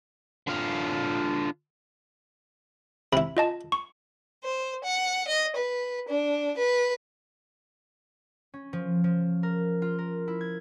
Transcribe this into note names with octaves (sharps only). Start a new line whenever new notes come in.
D3 F4
C3 E4 B5
F4 D#5 A5
C#6
C5
F#5
D#5
B4
D4
B4
C#4
F3
F3
A#4
F4
A#4
E4
G#6